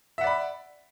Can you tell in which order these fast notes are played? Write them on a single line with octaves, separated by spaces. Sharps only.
E5 F#5 D5 B5